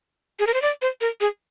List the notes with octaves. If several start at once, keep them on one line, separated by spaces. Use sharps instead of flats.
G#4
A#4
C5
D5
C5
A#4
G#4